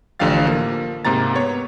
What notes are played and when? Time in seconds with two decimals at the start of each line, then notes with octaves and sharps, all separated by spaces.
0.19 A1 D3 F3 G4 F5 A6
0.45 F3 A#3
1.05 G#2 C3 A#3 A#5 A6
1.35 B3 C#5